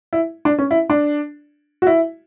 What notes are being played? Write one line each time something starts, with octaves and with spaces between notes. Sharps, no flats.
E4
D4
C#4
E4
D4
F#4
E4